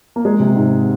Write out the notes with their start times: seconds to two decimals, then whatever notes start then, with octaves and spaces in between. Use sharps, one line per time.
0.16 A#3
0.25 G#3
0.40 C3
0.56 G#2